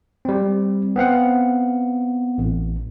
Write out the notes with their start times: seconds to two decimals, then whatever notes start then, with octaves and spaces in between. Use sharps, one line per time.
0.25 G3 C4
0.96 B3 C4 F5 F#5
2.38 A1